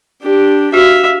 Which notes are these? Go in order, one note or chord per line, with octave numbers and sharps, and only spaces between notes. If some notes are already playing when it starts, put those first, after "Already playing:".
D4 G4
F#4 E5 F5